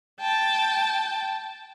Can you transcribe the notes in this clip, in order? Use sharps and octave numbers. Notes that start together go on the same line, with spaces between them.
G5 A5